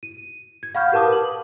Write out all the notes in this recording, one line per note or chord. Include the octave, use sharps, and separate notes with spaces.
D#7
G#6
F5 F#5 B5 C#6 F6 G6
G4 A#4 B4 A5 D6 D#6
F#7